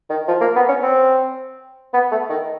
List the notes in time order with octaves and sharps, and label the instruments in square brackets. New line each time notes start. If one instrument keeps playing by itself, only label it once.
[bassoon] D#3
F3
A#3
B3
C#4
C4
B3
A3
D#3